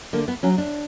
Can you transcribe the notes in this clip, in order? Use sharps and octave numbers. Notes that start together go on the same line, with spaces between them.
D3 A#3
B3
F#3 C#4
D4